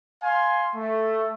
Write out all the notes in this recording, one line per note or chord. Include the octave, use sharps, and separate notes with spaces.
F5 G#5 C6
A3